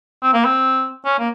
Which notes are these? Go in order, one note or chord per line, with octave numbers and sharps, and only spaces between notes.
C4
A#3
C4
C#4
A#3